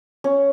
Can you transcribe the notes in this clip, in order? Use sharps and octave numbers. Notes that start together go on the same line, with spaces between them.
C#4